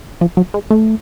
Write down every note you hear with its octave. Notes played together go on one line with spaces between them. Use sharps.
F3
F#3
G#3
A3